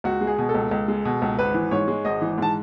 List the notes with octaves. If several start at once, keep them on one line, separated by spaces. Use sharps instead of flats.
C#2 F#4
G#3
G#4
B2
A4
C#2
C#2
G#3
B2
C#2
G#1 B4
E3
G#2 C#5
G#3
G#1 D#5
E3
G#2 A5